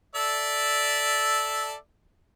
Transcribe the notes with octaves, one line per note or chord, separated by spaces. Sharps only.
A4 D5 E5